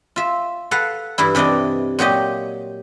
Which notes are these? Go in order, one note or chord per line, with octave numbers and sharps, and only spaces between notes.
F4 E5
A4 B4 F5 F#5
G2 E3 E4
C3 E3 D4 D5 D#5
A#2 F#3 G4 D#5